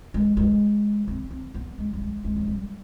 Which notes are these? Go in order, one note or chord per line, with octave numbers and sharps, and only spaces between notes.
G#3
G#3
C4
C4
B3
G#3
G3
G#3
G#3
F3
G3